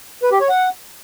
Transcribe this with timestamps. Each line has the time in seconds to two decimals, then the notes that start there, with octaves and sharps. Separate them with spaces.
0.23 B4
0.32 G4
0.40 C#5
0.49 F#5